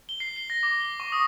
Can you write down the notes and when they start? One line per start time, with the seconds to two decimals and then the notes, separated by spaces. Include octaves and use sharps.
0.09 G7
0.20 C7
0.36 G7
0.50 A#6
0.63 D6
0.80 G7
1.00 C#6
1.12 D#6